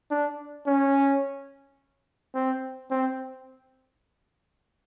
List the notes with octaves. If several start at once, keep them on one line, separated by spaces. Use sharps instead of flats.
D4
C#4
C4
C4